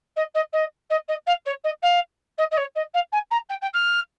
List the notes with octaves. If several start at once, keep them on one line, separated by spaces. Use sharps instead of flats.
D#5
D#5
D#5
D#5
D#5
F5
C#5
D#5
F5
D#5
D#5
C#5
D#5
F5
G#5
A#5
G5
G5
F6